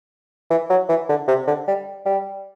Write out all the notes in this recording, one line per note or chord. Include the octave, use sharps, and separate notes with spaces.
E3
F#3
E3
D3
C3
D3
G3
G3